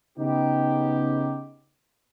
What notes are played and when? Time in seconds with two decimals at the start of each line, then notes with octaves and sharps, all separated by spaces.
0.18 C#3 B3 D#4 G4